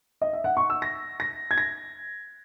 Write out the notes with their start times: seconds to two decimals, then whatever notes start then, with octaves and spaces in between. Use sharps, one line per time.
0.21 D#5
0.33 E5
0.44 F#5
0.57 C#6
0.70 E6
0.82 A#6
1.20 A#6
1.51 G#6
1.58 A#6